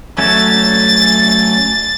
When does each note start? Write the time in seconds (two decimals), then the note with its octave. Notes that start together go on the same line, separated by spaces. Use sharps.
0.18 F#3 A3 C#4 A6